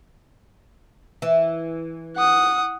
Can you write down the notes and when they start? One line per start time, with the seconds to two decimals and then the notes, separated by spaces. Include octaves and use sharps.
1.22 E3
2.17 F#5 D#6